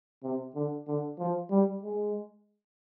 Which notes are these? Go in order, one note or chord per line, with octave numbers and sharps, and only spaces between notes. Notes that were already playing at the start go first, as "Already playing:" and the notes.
C3
D3
D3
F3
G3
G#3